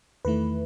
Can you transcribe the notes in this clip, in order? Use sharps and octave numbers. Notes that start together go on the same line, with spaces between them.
E2 D#3 A3 E4 B4